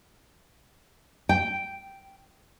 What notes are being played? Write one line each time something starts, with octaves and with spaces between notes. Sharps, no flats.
G5